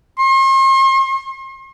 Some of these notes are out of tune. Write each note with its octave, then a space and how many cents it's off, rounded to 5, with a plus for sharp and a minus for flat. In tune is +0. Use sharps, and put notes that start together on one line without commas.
C6 +45